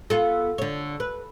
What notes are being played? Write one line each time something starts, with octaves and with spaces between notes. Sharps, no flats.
B3 F4 A4
D3 C#5
B4